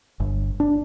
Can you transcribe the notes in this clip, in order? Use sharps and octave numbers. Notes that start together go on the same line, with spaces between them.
G1
D4